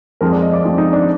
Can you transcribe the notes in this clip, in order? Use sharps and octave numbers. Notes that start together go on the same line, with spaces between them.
F2 F3 G#3 A#4
D5
D#5
D5
F2 F3 G#3
D#4
D4